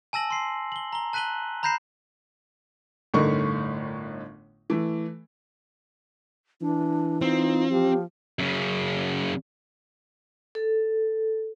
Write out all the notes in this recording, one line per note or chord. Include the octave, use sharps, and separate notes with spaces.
G#5 A5 E6 A#6 F#7
C6 C7
F#7 G7
A#5 G7
A5 F#6 B6 D#7 F#7 G7
A#5 B5 G6 A#6 C7 E7
G1 A2 D3 D#4 A#4 C#6
E3 A3
E3 D4
C4 D#4 F4
F3 G4
F#2 C#3
A4